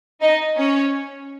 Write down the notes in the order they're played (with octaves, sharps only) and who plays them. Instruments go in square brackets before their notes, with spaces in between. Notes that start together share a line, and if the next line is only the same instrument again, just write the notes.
[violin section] D#4 D#5
C#4 C#5